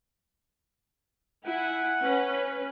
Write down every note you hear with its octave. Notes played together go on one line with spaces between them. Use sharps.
E4 F#5 G#5
C#4 B4